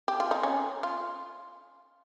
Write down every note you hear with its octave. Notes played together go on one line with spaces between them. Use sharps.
G4
F4
D#4
C#4
F4